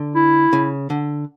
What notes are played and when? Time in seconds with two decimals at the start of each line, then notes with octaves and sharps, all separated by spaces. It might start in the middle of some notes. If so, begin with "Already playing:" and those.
Already playing: D3
0.15 E4
0.53 C#3
0.90 D3